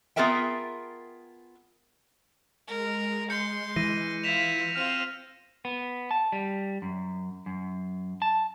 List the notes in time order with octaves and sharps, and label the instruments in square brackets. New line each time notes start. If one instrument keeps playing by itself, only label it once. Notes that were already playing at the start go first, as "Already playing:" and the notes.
[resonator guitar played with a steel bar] B3 F4 G#4 A#4 E5 G5
[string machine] G#3 [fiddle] A#4
[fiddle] C6 [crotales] G6 C#7
[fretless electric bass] E3 [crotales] A#6 D#7
[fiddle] E4 F4 [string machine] E6 [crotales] B6 E7 F7
[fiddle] C4 F4 [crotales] F6 D#7
[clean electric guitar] B3
A5
G3
F#2
F#2
A5